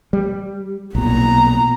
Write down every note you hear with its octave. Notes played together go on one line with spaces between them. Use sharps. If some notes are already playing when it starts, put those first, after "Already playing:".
G3
B1 A#2 B3 A#5